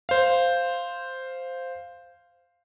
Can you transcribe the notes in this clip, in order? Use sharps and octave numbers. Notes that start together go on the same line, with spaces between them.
C5 F5